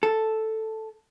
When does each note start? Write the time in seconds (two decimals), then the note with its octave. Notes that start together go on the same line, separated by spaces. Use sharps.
0.03 A4